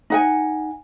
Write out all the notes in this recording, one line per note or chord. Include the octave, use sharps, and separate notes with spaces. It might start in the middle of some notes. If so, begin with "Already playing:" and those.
D#4 F#5 G#5